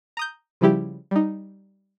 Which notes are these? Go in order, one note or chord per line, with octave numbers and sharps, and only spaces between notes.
A#5 D#6 G6
C#3 F3 G3 E4 G4
G3 D#4